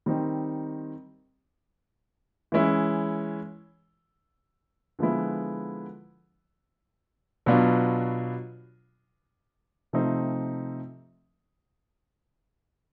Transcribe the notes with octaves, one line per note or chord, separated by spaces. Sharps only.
D#3 G3 C4 D#4
E3 G#3 C#4 E4
D3 F3 G#3 B3 E4
B2 F#3 B3 D4 F4
C3 F3 A3 C4 D#4